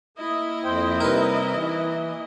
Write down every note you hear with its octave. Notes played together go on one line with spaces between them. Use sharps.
A#3 E4 D#5
F2 C5 G5
C3 G3 D#4 A#4 B4
E3